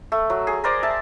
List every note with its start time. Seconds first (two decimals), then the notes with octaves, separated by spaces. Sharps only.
0.12 A3
0.30 F#3
0.47 G#4
0.64 A#4 C5 D5 A#5
0.83 E5 A5